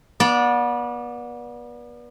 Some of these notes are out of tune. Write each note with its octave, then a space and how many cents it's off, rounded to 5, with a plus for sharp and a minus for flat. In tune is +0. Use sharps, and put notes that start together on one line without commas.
B3 -35 D5 -10